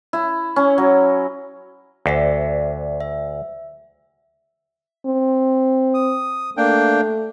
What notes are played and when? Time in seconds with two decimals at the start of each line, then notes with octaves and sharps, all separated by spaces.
0.13 E4
0.56 C#4
0.78 F#3
2.06 D2 C5 D5 E5
3.00 E5
5.06 C4
5.94 D#6
6.57 A3 A#3 D4 G5